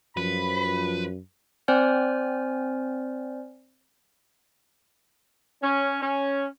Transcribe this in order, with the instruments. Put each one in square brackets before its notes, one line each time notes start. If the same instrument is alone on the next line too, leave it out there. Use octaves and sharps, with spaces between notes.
[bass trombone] F#2 [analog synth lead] F3 [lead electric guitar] B4 [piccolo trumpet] B5
[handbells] C4 C5 D5 G#5 F6
[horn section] C#4
C#4